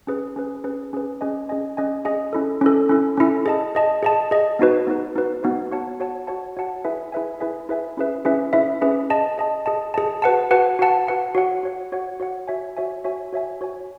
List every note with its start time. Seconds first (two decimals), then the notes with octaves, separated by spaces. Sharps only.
0.07 C#4 G#4 B4
0.36 C#4 G#4 B4
0.64 C#4 G#4 B4
0.93 C#4 G#4 B4
1.21 C#4 G#4 D#5 G#5
1.49 C#4 G#4 D#5 G#5
1.77 C#4 G#4 D#5 G#5
2.05 C#4 G#4 D#5 G#5
2.33 C#4 E4 A4
2.61 C#4 E4 A4
2.89 C#4 E4 A4
3.17 C#4 E4 A4
3.46 G#4 D#5 A5
3.75 G#4 D#5 A5
4.03 G#4 D#5 A5
4.31 G#4 D#5 A5
4.59 B3 D#4 F#4 B4
4.87 B3 D#4 F#4 B4
5.15 B3 D#4 F#4 B4
5.43 B3 D#4 F#4 B4
5.71 F#4 C#5 F#5 A5
6.00 F#4 C#5 F#5 A5
6.27 F#4 C#5 F#5 A5
6.57 F#4 C#5 F#5 A5
6.85 E4 G#4 B4 E5 G#5
7.12 E4 G#4 B4 E5 G#5
7.40 E4 G#4 B4 E5 G#5
7.69 E4 G#4 B4 E5 G#5
7.97 C#4 E4 G#4 B4 E5
8.25 C#4 E4 G#4 B4 E5
8.53 C#4 E4 G#4 B4 E5
8.81 C#4 E4 G#4 B4 E5
9.10 G#4 D#5 A5
9.38 G#4 D#5 A5
9.66 G#4 D#5 A5
9.94 G#4 D#5 A5
10.22 F#4 B4 F#5 A5
10.51 F#4 B4 F#5 A5
10.79 F#4 B4 F#5 A5
11.07 F#4 B4 F#5 A5
11.35 F#4 C#5 F#5
11.63 F#4 C#5 F#5
11.92 F#4 C#5 F#5
12.20 F#4 C#5 F#5
12.48 F#4 C#5 E5 G#5
12.77 F#4 C#5 E5 G#5
13.04 F#4 C#5 E5 G#5
13.33 F#4 C#5 E5 G#5
13.61 F#4 C#5 G#5